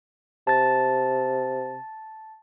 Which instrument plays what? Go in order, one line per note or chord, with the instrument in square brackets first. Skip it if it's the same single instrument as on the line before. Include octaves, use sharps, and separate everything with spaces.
[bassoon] C3 [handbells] A5 A6